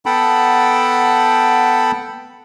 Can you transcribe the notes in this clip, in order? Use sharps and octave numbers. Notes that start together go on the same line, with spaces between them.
B3 A4 F#5 G5 A5 B5